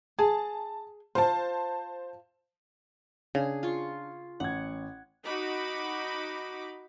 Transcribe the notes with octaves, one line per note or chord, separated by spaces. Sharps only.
G#4 A5
F4 C5 A5
C#3 D4 G#4
F4 C#6
A1 F#5 G#6
D#4 F#4 B5 D6